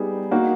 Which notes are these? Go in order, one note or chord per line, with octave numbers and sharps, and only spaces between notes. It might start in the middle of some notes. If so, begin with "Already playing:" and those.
Already playing: G3 B3 D#4 G#4
A#3 D#4 F#4